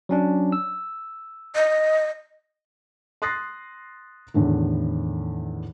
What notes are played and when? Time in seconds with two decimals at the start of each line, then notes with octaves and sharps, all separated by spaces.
0.09 F#3 C#4 D4
0.52 E6
1.55 D#5
3.22 C6 D#6 F#6 A6 A#6 C7
4.34 E2 A2 D3 D#3